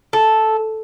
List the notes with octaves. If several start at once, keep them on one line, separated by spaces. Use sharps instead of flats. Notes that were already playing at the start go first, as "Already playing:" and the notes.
A4